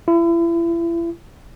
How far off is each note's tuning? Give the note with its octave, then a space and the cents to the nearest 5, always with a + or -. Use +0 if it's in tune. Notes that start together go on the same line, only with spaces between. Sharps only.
E4 +35